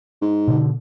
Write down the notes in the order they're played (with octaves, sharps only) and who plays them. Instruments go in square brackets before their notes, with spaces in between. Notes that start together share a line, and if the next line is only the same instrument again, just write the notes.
[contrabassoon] G#2
[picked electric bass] B2 D3